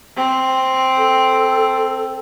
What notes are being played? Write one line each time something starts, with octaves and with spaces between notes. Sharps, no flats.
C4
A4